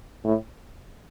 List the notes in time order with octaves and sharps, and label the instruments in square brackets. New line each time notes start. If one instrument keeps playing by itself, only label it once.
[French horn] A2